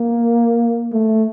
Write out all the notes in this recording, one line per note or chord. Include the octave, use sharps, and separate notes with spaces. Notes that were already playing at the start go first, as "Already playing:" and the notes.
Already playing: A#3
A3